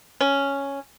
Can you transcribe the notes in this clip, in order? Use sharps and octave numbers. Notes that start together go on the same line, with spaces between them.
C#4